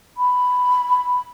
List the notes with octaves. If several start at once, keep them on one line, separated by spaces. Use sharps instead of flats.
B5